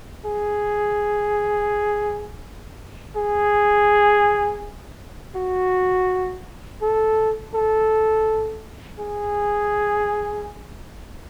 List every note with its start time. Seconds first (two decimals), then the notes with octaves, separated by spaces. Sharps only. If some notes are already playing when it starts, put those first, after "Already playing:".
0.25 G#4
3.16 G#4
5.35 F#4
6.82 A4
7.54 A4
8.99 G#4